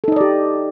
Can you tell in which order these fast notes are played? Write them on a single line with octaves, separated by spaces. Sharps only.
A4 D#4 D#5 D5 G4